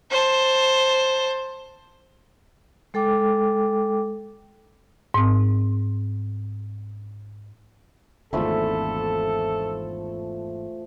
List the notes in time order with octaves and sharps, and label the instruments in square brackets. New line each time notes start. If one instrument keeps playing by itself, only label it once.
[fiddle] C5 A5
[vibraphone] G#3 A4 G5 D6
[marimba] G#2 C4
[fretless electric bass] G#1 E2 D3 [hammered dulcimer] F3 A3 B5 [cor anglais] A4